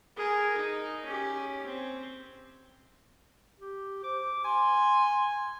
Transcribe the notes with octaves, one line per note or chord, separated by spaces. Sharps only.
G#4 A#4
D#4
C#4 G4
C4
G4
C5 D6
G#5 C6